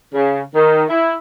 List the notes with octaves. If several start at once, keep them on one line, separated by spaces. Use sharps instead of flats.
C#3
D#3
E4